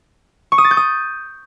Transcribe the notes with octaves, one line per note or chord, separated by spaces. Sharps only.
C#6
D#6
A6
G6
D#6